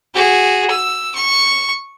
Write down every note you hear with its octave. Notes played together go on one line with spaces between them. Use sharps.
F#4 G#4
E6
C#6